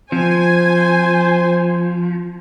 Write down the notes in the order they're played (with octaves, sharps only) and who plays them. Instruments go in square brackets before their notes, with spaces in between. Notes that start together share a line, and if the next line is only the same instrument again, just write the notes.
[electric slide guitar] F3 [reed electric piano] C4 [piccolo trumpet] C5 [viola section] G#5